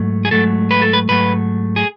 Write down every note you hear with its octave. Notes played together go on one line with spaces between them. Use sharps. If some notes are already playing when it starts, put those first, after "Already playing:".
Already playing: G#2 F#3 A3
G#4
G#2 F#3 A3 A4
B4
A4
B4
G#2 F#3 A3 B4
G#4